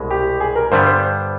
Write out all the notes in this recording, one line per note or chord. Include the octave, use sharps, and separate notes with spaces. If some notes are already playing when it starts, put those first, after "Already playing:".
Already playing: C2 B2 G#3
G4
G#4
A#4
G2 D3 G3 B3 C5
C5